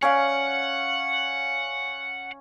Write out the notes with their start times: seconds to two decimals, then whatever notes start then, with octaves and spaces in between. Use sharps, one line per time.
0.02 C#4 D5 F5 F#5